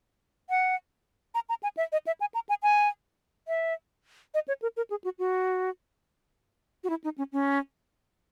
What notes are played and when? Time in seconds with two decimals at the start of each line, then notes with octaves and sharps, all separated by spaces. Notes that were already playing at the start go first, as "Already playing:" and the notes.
0.50 F#5
1.35 A#5
1.49 A#5
1.63 G#5
1.77 E5
1.92 D#5
2.07 E5
2.20 G#5
2.34 A#5
2.49 G#5
2.63 G#5
3.48 E5
4.34 D#5
4.48 C#5
4.62 A#4
4.77 A#4
4.90 G#4
5.04 F#4
5.19 F#4
6.84 F#4
6.90 E4
7.04 D#4
7.18 C#4
7.32 C#4